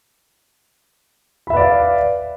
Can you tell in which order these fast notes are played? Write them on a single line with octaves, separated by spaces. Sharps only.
B5 E5 B4 D5 F5